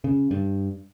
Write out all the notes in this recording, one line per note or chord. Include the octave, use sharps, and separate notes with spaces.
C#3
G2